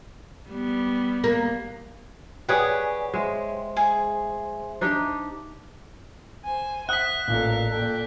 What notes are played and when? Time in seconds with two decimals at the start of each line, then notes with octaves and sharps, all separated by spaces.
0.50 G3 B3
1.24 A#3
2.49 G4 G#4 B4 C#5 D5 F#5 G#5 D#6
3.14 G#3 C5 E5 C6
3.77 G#4
4.81 D4 D#4 G4
6.44 C5 G#5
6.89 E5 F#5 D#6 F#6 B6
7.28 A1 A#2 A4 A#4 F5
7.71 A#2 A4 D5 G5